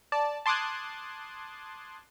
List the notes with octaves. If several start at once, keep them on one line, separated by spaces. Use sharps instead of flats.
D5 A5
A5 C6 D6 D#6 F#6 G#6